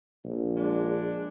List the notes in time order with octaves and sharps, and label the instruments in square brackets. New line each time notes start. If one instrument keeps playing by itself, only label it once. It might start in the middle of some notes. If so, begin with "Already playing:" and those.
[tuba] A#1
[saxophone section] G#3 D4